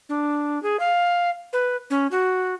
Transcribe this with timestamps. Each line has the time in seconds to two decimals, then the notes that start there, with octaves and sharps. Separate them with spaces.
0.09 D4
0.63 G#4
0.80 F5
1.53 B4
1.90 C#4
2.11 F#4